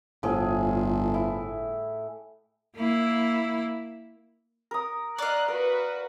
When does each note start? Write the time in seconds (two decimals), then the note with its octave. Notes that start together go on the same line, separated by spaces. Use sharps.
0.23 G1 A2 F3 G#4
1.14 E4
2.77 A#3 E4
4.71 A#4 D#6
5.19 D5 D#5 F5 F#6
5.48 F#4 A#4 B4